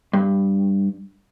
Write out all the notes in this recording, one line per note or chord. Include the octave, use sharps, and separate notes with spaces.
G2